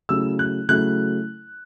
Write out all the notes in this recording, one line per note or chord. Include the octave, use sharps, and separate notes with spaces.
C#3 F#3 A3 E4 E6
F#6
C#3 F#3 A3 E4 F#6